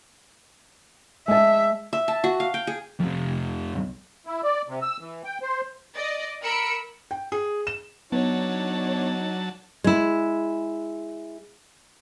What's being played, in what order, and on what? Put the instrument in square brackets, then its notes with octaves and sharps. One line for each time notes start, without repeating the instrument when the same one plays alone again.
[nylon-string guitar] G#3 A5 [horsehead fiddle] E5
[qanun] E5
A5
F#4
F5
G5
G#4
[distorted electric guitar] F2 C3
[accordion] E4
D5
C3
E6
E3
G5
C5
[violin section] D5 D#5
A#4 B5 E6 C#7 D7
[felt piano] G5
G#4
E7
[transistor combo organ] F#3 A5 [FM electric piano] B3 [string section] D4 C#5 [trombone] D#4
[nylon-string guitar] G#3 E4